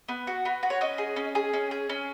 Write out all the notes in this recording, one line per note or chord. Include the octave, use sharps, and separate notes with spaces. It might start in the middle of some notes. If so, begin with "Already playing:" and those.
B3
F#4
B3
F#4
C#5
C#4 D#5
G#4
C#4
G#4
C#4
G#4
C#4